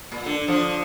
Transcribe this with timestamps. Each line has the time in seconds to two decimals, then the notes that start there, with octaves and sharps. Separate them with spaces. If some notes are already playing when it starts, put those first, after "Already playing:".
0.12 A#2
0.26 D3
0.48 D3 F3